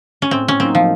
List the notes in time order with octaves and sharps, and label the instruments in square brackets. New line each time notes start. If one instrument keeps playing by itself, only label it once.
[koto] C#4
[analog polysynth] A2 [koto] C4
[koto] C#4
[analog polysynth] F#3 A#3 D#4 [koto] C4
[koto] F3